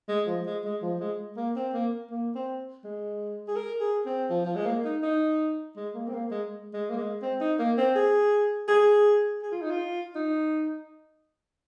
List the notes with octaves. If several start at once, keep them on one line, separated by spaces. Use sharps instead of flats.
G#3
F3
G#3
G#3
F3
G#3
A#3
C4
A#3
A#3
C4
G#3
G#4
A#4
G#4
C4
F3
F3
G#3
A#3
D#4
D#4
G#3
A#3
C4
A#3
G#3
G#3
A#3
G#3
C4
D#4
A#3
C4
G#4
G#4
G#4
F4
D#4
F4
D#4